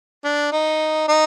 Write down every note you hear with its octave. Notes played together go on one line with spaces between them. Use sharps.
D4
D#4
D#4